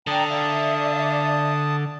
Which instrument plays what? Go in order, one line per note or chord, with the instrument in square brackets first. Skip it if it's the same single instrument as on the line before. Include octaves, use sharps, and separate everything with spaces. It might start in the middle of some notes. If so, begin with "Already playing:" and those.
[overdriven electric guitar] D3 [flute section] D5 G5 A#5 [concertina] A5 D#6
[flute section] D5 E5 F5